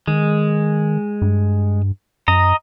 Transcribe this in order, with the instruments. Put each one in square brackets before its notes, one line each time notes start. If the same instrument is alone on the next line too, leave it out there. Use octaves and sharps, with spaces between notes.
[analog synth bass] D#3 [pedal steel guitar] G#3
[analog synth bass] G2
[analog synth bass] F#2 [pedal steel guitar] D#5 A#5